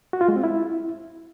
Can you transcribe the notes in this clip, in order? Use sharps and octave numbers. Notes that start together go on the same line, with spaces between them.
F#4
F4
G#3
C4
E4